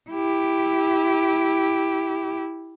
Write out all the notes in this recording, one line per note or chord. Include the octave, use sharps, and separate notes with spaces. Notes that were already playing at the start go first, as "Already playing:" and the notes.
E4 G4